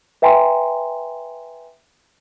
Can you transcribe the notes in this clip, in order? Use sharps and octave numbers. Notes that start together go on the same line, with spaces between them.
B4 E5 G5 G#5 A#5 C6